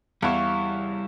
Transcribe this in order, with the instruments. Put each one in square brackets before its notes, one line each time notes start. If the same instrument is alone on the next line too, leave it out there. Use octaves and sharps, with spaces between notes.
[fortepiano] E2 [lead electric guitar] G3 E4 [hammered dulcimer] C#5 F5